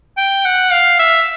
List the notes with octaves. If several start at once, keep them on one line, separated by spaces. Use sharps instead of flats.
G5
F#5
F5
E5